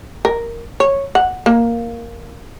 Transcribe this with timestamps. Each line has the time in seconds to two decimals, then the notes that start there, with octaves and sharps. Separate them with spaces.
0.25 A#4
0.80 C#5
1.15 F#5
1.46 A#3